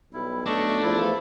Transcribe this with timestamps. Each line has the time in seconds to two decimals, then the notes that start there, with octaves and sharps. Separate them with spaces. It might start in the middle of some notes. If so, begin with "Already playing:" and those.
0.13 B1 G3 E4
0.46 A3 D4 D#5 C#6 E6
0.83 E2 F3 E4 D5 E5